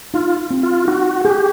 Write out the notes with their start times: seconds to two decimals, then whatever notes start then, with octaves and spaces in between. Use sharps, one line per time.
0.14 D#4 F4
0.51 C4
0.63 F4
0.88 D#4 F#4
1.25 G4 G#4